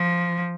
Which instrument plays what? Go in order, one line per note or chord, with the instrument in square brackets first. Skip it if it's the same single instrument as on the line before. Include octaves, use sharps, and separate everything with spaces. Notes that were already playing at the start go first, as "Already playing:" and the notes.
Already playing: [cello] F3